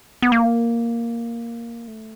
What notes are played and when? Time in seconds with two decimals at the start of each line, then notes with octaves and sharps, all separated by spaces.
0.22 B3
0.32 A#3
1.88 A3